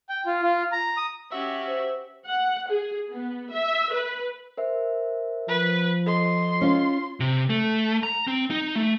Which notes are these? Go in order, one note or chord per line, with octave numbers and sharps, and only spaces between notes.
G5
F4
F4
A#5
D#6
C#4 F#4 G4 E5
C5
F#5
G#4
B3
E5
B4
A#4 C5 E5
F3 B4
A4 D#5 C6
C#4 F4
C3
A3
A#5
C4
D#4
A3